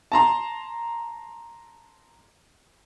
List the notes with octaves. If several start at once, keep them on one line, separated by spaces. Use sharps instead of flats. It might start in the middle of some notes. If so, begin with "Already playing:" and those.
A5 A#5 C6